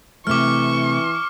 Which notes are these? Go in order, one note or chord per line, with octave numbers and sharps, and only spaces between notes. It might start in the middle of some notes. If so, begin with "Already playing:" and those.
C3 E3 A3 C#6 D6 F6